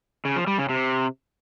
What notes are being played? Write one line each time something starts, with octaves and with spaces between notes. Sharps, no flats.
C#3
F3
G3
C#3
C3